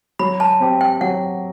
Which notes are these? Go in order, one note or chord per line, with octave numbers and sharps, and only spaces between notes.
F#3 B5
A5
C4 G4
G5
F#3 F#5